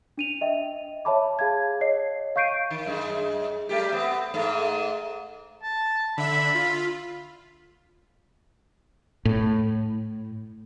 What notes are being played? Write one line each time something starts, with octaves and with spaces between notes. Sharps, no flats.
D4 D#7 F7
D#5 E5 G5
C#5 E5 A5 B5 D6
G#4 F5 A5 G#6
C#5 D#5 C7
F5 C#6 G6 C7 D7 D#7
D#3
F#2 G#3
G3 A3 G4
B3 C4
G#2 A3
A5
D3 E5 B5
F4
A2